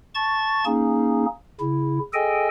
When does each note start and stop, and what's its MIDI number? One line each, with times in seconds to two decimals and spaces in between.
0.15 0.64 81
0.15 0.64 85
0.15 0.64 93
0.65 1.26 58
0.65 1.26 61
0.65 1.26 63
0.65 1.26 68
1.60 1.99 49
1.60 1.99 64
2.13 2.48 68
2.13 2.48 69
2.13 2.48 75
2.13 2.48 79
2.13 2.48 80